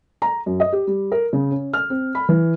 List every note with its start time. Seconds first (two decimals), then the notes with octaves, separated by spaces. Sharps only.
0.22 A#5
0.46 F#2
0.60 D#5
0.73 G4
0.87 G3
1.12 A#4
1.33 C#3
1.51 C#4
1.73 F6
1.90 C4
2.15 B5
2.29 E3